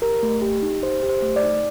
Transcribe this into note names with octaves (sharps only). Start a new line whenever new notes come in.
G4 A#4
A3
G4
D#4
G4 C5
G4
C5
A3
D5
D#4